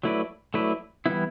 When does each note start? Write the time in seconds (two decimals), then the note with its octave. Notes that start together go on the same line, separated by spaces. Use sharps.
0.03 F#3 A3 E4 B4 D5
0.54 F#3 A3 E4 B4 D5
1.06 E3 G3 B3 E4